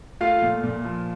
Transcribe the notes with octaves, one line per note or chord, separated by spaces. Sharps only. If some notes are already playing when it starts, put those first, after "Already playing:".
A3 F4 F5
A#2
A#2
F3